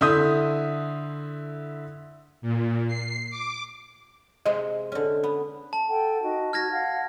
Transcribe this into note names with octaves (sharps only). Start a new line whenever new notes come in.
D3 E4 E5 C6 D#6 G6
A#2
C7
D6
C3 G#3 D#5
D3 C#4
B3
A5
A4 F#5 G5
D#4 F#4 D#5
F#4 F6 G#6 A#6
F5 F#5